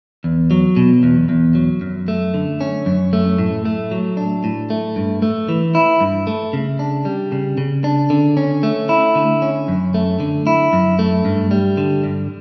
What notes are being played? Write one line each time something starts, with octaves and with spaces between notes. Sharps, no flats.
E2
F#3
B2
E2
E2
F#3
F#2
A3
D3
C#4
F#2
A3
A2
A3
F#3
D4
A2
A3
G2
A3
E3
E4
G2
A3
C#3
D4
G3
C#3
C#3
D4
D3
C#4
A3
E4
D3
C#4
F#2
A3
D3
E4
F#2
A3
G2
G3
D3
G2